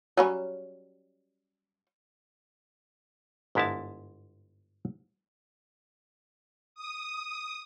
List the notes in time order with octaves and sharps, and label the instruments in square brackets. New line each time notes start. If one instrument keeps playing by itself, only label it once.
[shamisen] F#3 G3 C#4
[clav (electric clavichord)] G1 G#2 B3 E4 A#4 A5
[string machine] D#6